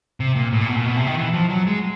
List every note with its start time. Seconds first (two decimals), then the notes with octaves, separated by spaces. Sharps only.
0.20 C3
0.36 A#2
0.53 A2
0.61 A#2
0.69 B2
0.77 A#2
0.85 B2
0.96 C3
1.07 D#3
1.17 E3
1.34 F3
1.50 F#3
1.67 G#3